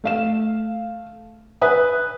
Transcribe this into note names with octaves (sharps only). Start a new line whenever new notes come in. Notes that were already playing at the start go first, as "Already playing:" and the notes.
A3 F5 E7
B4 E5 G#5 D#6